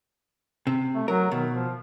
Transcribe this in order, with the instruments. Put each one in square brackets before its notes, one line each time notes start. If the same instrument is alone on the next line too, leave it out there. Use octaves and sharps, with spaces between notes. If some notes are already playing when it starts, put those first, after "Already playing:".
[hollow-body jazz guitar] C3
[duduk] A3
[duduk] F#3 [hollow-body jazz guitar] A#4
[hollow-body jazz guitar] B2 [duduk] D#3
[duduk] F3